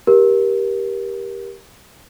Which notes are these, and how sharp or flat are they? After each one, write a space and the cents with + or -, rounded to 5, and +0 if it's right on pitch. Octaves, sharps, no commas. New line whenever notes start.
G4 +0 A#4 +25